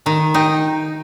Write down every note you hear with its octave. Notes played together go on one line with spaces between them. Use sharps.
D#3 A#5
D#4 G5